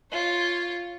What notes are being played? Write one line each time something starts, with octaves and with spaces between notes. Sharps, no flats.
F4 C#5